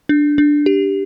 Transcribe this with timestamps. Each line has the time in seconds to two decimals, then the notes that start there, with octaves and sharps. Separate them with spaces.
0.09 D4
0.38 D4
0.66 G4